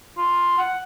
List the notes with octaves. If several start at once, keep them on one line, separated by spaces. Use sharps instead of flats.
F4
F#5